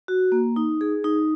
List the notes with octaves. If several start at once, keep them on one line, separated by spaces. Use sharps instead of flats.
F#4
A#3
D#4
G#4
D#4